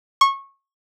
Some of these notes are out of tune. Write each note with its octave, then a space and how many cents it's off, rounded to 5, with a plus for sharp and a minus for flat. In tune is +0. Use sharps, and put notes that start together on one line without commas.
C#6 -20